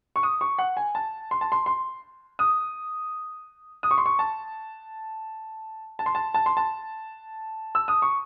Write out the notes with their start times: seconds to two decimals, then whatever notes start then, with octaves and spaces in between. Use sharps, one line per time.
0.16 C#6
0.23 D#6
0.41 C#6
0.59 F#5
0.77 G#5
0.95 A5
1.31 C6
1.41 A5
1.52 C6
1.66 C6
2.39 D#6
3.83 D#6
3.91 C#6
3.98 C6
4.06 C#6
4.19 A5
5.99 A5
6.06 C6
6.15 A5
6.34 A5
6.46 C6
6.57 A5
7.75 E6
7.88 D#6
8.02 C#6